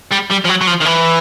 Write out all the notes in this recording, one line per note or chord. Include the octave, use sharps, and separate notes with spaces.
G3
G3
F3
F#3
F#3
F3
D#3
E3